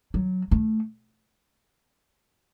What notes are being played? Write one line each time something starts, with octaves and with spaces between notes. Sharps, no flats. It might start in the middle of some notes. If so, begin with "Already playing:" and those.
F#3
A3